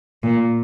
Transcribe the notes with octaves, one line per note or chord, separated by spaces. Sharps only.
A#2